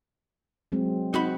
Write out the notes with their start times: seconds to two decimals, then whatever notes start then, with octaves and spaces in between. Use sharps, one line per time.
0.72 F#3 G#3 C4
1.14 C4 D#4 F#4 B5